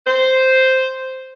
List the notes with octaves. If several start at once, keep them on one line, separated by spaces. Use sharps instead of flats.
C5